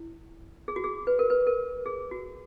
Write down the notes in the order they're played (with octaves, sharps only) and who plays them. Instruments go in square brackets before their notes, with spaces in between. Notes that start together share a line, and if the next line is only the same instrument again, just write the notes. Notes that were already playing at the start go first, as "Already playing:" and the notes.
Already playing: [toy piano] E4
G#4
F#4
G#4
B4
A#4
B4
A#4
G#4
F#4